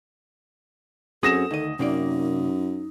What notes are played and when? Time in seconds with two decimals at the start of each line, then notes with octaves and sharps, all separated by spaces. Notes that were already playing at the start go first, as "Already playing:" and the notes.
1.23 F#2 C4 F#4 G#4 A4 D#6 A#6 E7
1.51 D2 D#3 D#5
1.79 F#2 C3 A#3 D#4 D5